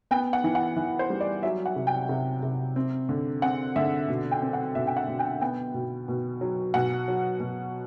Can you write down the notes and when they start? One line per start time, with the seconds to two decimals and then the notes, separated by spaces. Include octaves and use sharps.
0.11 B3 G5
0.33 F#5
0.44 E3
0.55 F#5
0.76 E3
0.99 C5
1.10 G3
1.21 D5
1.43 F#3 E5
1.66 F#5
1.76 C3
1.87 G5
2.09 C3
2.43 C3
2.76 C4
3.09 D3
3.42 C4 F#5
3.76 D3 E5
4.08 B2
4.31 G5
4.42 C4
4.53 F#5
4.75 B2 E5
4.87 G5
4.97 F#5
5.08 B2
5.19 G5
5.41 B3 G5
5.74 B2
6.08 B2
6.41 F#3
6.74 B2 F#5
7.08 F#3
7.40 B2